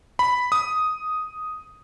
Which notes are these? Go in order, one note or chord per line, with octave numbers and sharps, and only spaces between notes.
B5
D#6